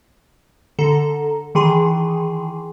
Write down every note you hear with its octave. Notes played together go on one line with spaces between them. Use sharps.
D3 A4 A#5
D#3 E3 G#4 C6